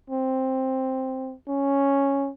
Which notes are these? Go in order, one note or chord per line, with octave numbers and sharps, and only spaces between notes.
C4
C#4